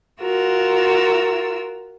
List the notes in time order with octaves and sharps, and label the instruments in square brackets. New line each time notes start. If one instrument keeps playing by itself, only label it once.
[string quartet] F4 F#4 A#4 E6